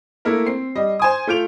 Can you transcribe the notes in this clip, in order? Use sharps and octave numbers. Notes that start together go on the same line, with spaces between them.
A3 A#3 E4 A#4
C4 C7
G3 D#5
C5 G#5 D#6
A3 F4 G6 D7 F7